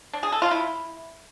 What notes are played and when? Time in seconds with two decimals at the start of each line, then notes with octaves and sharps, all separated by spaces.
0.13 D4
0.23 G#4
0.32 A4
0.42 F4
0.51 E4